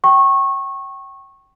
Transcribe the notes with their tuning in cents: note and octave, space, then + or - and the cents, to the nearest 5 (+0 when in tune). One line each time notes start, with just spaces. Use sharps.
G5 -25 C#6 -20